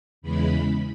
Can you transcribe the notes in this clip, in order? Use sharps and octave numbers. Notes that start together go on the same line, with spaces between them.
E2 C#3 E3 G#3 B5